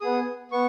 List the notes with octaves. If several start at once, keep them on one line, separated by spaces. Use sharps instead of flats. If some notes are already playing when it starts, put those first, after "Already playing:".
B3 G#4 D#6
B3 C#6